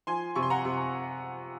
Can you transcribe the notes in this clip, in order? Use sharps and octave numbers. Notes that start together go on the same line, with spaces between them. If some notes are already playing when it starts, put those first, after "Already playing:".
F3 G#5 C6
C3 C#6
C6
F#5 A#5
C3